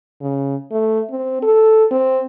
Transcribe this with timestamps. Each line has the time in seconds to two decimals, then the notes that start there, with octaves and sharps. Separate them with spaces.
0.21 C#3
0.71 A3
1.10 C4
1.43 A4
1.91 C4